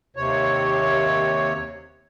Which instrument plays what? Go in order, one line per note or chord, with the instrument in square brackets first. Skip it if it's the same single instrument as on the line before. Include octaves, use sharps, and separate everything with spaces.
[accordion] D#2 C3 C#5